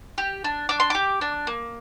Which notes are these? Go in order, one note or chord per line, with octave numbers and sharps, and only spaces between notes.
G4
D4
D4 D6
C6
G4 D6
D4
A#3